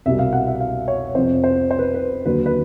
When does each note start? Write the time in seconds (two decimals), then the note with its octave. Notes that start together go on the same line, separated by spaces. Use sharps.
0.06 C2 B2 G3 E5
0.19 F5
0.33 F#5
0.47 E5
0.60 F5
0.88 C#5
1.15 F2 C3 F3 C5
1.44 C5
1.71 C5
1.79 B4
1.94 B4
2.25 D#2 D3 F#3 B4
2.46 B4